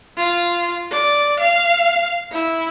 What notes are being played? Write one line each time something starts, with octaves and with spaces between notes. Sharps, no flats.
F4
D5
F5
E4